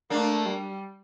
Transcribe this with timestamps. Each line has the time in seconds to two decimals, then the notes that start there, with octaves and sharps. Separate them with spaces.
0.10 A3 A#3 D4
0.45 G3